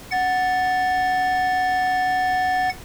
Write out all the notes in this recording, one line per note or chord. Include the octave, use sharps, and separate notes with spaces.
F#5 A6